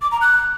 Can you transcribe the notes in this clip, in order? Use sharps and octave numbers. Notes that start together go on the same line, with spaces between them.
D6
A#5
F#6